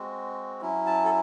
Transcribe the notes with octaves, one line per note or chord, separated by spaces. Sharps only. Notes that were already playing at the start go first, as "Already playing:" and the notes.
Already playing: G#3 C4 F#4
F#3 C#4 E4
A5
A4